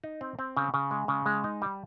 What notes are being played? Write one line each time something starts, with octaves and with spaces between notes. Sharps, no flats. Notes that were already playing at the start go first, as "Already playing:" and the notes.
D#4
C4
C4
C#3
C#3
G#3
C#3
G#3
D#4
G3